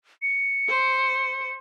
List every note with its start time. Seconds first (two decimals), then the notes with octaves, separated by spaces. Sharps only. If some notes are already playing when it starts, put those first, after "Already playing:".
0.22 C#7
0.69 C5